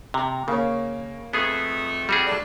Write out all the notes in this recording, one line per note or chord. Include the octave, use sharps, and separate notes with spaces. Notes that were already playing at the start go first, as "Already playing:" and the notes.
C3 A#5
C#3 A#3 C#5
F2 A3 B3 G#4 D#6 G#6
G3 F#4 G#4
A3 D4